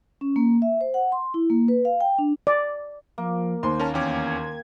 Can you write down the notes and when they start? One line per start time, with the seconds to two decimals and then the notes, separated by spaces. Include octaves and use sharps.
0.21 C#4
0.36 A#3
0.62 E5
0.81 C5
0.94 F#5
1.12 C6
1.34 E4
1.50 A#3
1.68 B4
1.85 F5
2.01 G5
2.18 D4
2.47 D5
3.18 F3 A#3
3.63 D#2 C5 C6
3.80 C#4 A#4 A5
3.94 E2 C#4 G4 D6 G#6